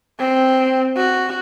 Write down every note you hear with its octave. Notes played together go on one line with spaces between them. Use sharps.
C4
F#4